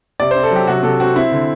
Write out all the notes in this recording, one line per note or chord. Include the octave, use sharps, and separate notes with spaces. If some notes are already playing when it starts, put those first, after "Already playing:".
C3 D5
C5
C4
A4
F#3 G4
C3 F#4
C3 A4
C4 F#4
C4 E4
D3